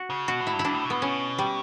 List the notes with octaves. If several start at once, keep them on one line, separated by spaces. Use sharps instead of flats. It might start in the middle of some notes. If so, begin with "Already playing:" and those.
Already playing: F#4
C#3
B2 F#4
A2
E4
G2
E4
G2 D4
A2
B2
A2 B3
B2 C#4
G3